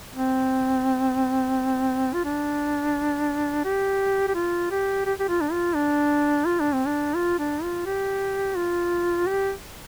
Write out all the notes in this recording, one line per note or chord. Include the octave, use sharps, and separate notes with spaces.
C4
F4
D4
G4
G4
F4
G4
G4
G4
F4
D4
F4
D4
F4
D4
C4
D4
F4
D4
F4
G4
F4
G4